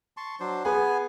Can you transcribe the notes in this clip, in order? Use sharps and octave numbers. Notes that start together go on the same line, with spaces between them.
A5 C6 C#6
F#3 D4 C5
B3 G#4 B4 G#5